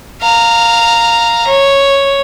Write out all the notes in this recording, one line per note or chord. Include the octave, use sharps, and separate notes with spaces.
F5 A#5
C#5